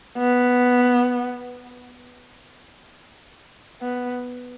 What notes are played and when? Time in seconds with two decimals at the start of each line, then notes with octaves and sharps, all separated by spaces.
0.17 B3
3.82 B3